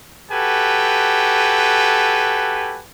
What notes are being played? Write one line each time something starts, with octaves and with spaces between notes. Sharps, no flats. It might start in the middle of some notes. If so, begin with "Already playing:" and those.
F#4 G4 A4 B4 G#5